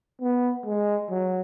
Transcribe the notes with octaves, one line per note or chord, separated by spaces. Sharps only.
B3
G#3
F#3